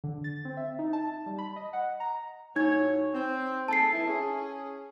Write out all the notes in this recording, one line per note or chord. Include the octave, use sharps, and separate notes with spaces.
D3
A6
C4
E5
D#4
A5
G3
B5
D#5
F#5
A#5
A2 F#3 D#4 C#5 G#6
C4
D#4 G#4 A4 A5 C7
E3 E4
C#4 G#4